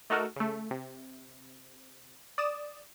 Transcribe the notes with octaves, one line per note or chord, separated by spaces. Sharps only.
A3 D#4 F#4 A4 A#4
C#3 A3
C3
D5 D#6 E7